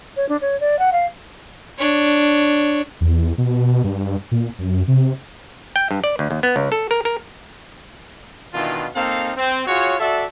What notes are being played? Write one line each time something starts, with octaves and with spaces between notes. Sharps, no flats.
C#5
D4
C#5
D5
F#5
F5
D4 C#5
E2
B2
G2
A#2
F#2
C3
G5
G2
D5
D2
D#2
B3
C#2
A4
A#4
A#4
B2 D#3 E3 D4 F4
A#3 C4 D#4 A4 F5
C4
F4 F#4 G#4 C#5
F#4 A4 D5 E5